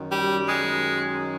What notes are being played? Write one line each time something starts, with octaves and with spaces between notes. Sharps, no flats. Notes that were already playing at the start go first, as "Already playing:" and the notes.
Already playing: F#2 D#3 F#3
G3
G#3